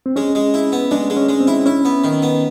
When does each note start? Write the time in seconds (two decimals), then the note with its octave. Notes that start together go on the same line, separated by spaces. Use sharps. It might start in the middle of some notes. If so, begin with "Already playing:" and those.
0.06 C4
0.16 G#3 C#4
0.35 G#3
0.54 E4
0.72 B3
0.91 G#3 D4
1.10 G#3
1.17 C#4
1.29 G#3
1.40 C4
1.47 E4
1.66 C#4 E4
1.85 B3
2.04 D#3
2.22 B3